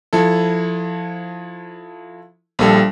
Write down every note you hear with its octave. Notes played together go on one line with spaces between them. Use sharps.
F3 E4 A4
A#1 G3 A4 F5 E6